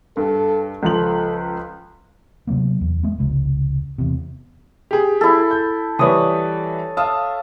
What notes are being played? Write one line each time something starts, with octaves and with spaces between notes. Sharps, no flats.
G2 A4
C#2 F3 A4 F#7
C3 F#3 A#3 B3
E2
G#3 B3
F1 C#2
E2 C3
G4 G#4
E4 A4
G6
E3 G3 B4 C#5 D#6
E5 F5 A5 D#6